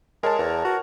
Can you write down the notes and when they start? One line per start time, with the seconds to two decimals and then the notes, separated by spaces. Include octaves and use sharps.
0.23 G#3 A#4 C#5 A5
0.39 E2
0.65 F#4